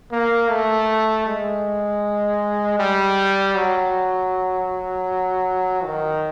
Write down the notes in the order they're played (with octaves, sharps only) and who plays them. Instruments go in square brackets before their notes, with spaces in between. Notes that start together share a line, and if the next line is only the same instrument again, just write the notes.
[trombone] A#3
A3
G#3
G3
F#3
D#3